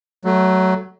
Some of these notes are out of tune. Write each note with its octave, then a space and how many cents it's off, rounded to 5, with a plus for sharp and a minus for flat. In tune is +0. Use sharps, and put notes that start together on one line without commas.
F#3 +15 A3 -10